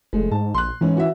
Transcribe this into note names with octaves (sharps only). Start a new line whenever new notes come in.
F1 G#3 A3
G#2 A5
A#1 C6 F#6
G#2 E3 C#4
F#4 E5